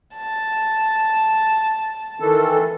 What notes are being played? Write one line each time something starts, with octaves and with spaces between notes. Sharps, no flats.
A5
D#3 E3 A4